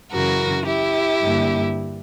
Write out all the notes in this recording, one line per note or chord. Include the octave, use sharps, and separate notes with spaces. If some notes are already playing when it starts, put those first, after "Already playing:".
F#2 C#3 E3 F#4 A#4
E4 G4
G2 D3 A#3